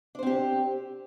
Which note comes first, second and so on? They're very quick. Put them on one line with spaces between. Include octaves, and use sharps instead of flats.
D4 C5 C4 G4